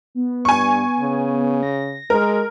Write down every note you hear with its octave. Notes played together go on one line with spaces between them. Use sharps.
B3
G2 G#5 C#6
C#3
A#6
G#3 A#4